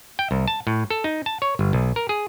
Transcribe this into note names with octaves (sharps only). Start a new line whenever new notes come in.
G5
C2
A5
A2
A4
D#4
A5
C#5
G1
B1
A#4
G#4